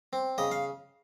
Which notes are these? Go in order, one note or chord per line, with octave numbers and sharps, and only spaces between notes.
C4
C#3 D#5
F5